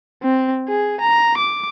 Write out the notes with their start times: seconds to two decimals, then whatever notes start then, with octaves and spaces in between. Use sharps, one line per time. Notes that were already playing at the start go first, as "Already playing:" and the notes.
0.23 C4
0.68 G#4
1.01 A#5
1.38 D6